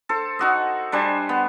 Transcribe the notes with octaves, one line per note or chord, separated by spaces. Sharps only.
A4 C5
D#4 F#4 D#5
G3 D4 C5 G#5
B3